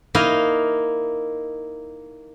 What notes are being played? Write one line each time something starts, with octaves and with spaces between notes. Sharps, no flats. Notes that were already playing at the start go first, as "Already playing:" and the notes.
A#3 D#4 E4 D#5 F5